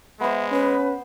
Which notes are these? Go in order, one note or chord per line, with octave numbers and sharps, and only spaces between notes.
G#3 B3 C5 E5
C#4 B4